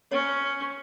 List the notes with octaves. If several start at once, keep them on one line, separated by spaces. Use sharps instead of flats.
C#4 C#5